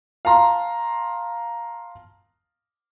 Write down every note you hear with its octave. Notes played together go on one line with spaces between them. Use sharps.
F5 A5 A#5 C6